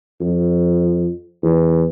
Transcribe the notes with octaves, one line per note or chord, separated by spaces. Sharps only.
F2
E2